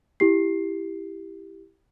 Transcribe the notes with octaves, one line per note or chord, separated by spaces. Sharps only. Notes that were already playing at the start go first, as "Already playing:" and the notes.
E4 G4 C7